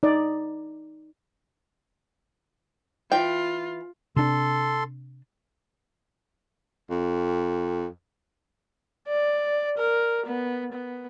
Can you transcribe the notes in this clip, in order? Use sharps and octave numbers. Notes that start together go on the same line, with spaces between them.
D#4 D5
E3 F4 G5
C3 D4 A4 C6
F2
D5
A#4
B3
B3